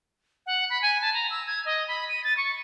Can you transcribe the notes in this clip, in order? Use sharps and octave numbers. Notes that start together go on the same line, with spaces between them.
F#5
B5
G#5
A5
A#5
E6
G#6
D#5
B5
D#7
A6
C#6